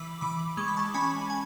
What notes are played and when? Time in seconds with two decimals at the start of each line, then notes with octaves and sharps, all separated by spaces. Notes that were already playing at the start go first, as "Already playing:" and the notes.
Already playing: E3 B5 D6
0.21 E3 B5 D6
0.57 G#3 C#6
0.68 B5
0.76 A5 C#6
0.94 C#4 G#5 B5
1.30 G#5